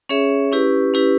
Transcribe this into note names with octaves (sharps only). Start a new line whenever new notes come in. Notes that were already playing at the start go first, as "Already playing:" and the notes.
C#4 G#4 C#5 E5
C#4 E4 G4 B4
C#4 E4 G4 B4